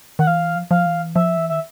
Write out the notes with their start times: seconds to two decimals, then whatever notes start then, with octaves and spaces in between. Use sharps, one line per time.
0.19 D#3 F#5
0.27 E3 F5
0.56 F3
0.71 F3 F5
0.86 E3
1.15 F3 E5
1.37 E3
1.50 D#3 E5